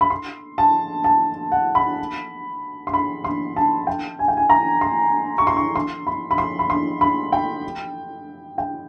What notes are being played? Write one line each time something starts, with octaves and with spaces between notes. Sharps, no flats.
B5
C6
A5
A5
F#5
B5
C6
B5
C6
A5
G5
G#5
G5
G#5
A#5
C6
C#6
C6
C#6
C6
B5
B5
C6
B5
C6
B5
G5
G5